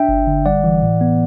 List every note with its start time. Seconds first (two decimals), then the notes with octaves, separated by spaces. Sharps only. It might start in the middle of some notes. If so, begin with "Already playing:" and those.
Already playing: D4 E5 G5
0.09 G1
0.27 D3
0.46 G3 D5 F#5
0.64 E3
0.82 A2
1.01 B3